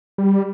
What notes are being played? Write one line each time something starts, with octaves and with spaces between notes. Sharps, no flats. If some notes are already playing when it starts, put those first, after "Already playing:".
G3